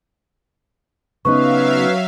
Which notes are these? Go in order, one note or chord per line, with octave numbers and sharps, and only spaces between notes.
C#3 F#3 B3 D#4 B4 E5 F5 C#6